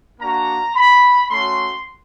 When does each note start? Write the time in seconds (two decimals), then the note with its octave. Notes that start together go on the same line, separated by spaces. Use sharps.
0.20 A#3 D4 F#4 A#5
0.75 B5
1.30 A3 C#4 F#4 C6